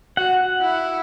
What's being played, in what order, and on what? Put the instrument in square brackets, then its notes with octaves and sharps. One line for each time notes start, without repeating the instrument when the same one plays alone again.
[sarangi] F#4 [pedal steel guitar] F#5
[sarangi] E4